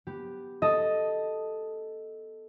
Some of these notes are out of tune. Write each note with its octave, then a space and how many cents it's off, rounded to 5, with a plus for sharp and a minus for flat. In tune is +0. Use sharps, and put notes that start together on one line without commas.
B3 +0 G4 +0
A4 +0 D#5 +0